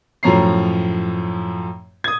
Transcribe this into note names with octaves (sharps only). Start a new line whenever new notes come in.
F#2 A2 F3 C#5 A#5 C7
D#6 G#6